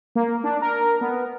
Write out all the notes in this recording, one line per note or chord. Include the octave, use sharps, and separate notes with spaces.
A#3
D4
A#4
B3